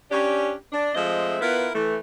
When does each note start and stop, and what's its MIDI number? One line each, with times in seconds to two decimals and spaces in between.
0.12 0.54 61
0.12 0.54 62
0.12 0.54 67
0.73 0.90 62
0.95 1.37 53
0.95 1.37 56
0.95 1.37 57
0.95 1.37 60
0.95 1.37 75
0.95 1.37 76
1.41 1.68 59
1.41 1.68 64
1.41 1.68 65
1.41 1.68 70
1.41 1.68 71
1.75 1.97 52
1.75 1.97 57